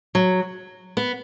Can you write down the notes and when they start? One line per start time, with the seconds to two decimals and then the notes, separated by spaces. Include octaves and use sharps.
0.15 F#3
0.97 B3